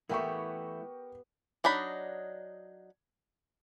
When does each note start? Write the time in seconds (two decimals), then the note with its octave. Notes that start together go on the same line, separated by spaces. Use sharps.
0.09 E3 A3 B3 E4 G4 A#4 G5 C#6
1.64 F#3 D4 D#4 B5